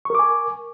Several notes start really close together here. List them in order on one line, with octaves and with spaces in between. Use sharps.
C#6 A#4 D6 G#5